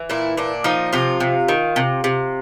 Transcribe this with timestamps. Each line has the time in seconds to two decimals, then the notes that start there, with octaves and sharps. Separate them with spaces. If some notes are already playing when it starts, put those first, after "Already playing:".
Already playing: E3
0.10 A#2 E4
0.37 A#2 D4
0.64 F3 D#4
0.93 C3 F4
1.20 C3
1.48 D#3
1.76 C3
2.04 C3